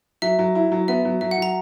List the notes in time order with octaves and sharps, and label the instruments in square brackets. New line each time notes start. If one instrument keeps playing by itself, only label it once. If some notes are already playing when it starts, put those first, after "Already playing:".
[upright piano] F#3 [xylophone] E5
[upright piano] F#3
E4
F#3
[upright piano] B3 [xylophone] E5
[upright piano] F#3
[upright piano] F#3 [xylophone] E5
[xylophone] F#5
[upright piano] F#3 [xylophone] A#5